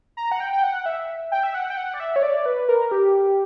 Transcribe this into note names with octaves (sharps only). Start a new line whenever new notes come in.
A#5
F#5
G5
G5
F#5
E5
G5
E5
F#5
G5
F#5
D5
E5
C#5
D5
B4
A#4
G4